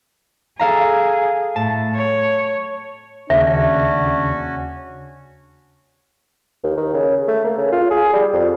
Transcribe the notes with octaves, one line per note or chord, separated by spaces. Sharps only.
G#4 A4 F5 A#5
A2 A5
C#5
D#2 C#3 C#4 D4 F#4 E5
D#2
D#3
C#3
A3
A#3
C#3
F4
G#4
G3
F2